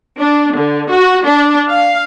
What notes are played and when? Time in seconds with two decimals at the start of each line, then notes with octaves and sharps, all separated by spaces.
0.18 D4
0.56 D3
0.91 F#4
1.26 D4
1.69 F5